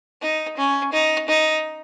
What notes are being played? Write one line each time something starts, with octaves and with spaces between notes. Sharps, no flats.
D#4
C#4
D#4
D#4